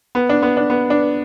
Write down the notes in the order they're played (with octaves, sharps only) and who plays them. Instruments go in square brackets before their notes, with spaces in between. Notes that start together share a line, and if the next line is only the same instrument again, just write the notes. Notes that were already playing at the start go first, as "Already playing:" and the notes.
[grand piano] B3
D4
B3
D4
B3
D4